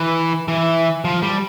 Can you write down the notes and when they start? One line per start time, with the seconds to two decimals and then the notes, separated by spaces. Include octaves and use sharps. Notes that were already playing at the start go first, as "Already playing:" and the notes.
Already playing: E3
0.48 E3
1.05 F3
1.23 G3